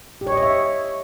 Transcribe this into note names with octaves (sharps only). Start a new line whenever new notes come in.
G4
C#5
D#5
C#5
E5